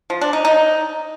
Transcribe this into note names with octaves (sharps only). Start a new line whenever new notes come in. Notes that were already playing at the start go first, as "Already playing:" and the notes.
F3
D4
D#4
D#4